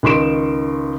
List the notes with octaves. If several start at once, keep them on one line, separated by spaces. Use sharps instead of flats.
C#2 D#3 C6 C#6 D7 E7